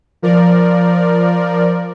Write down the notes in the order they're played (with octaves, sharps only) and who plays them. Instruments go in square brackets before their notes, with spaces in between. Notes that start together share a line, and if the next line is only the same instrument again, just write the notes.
[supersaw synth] F3 A#4 D5